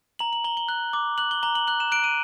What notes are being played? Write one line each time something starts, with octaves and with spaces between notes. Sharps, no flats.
A#5 F#7
F#7
A#5 G7
G7
F#6
D6
F#6 F#7
G7
A#5 G7
F#7
F#6 F#7
E7
F#6 D7
D#7